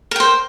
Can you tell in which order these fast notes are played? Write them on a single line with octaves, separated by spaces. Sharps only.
A#4 G5 C5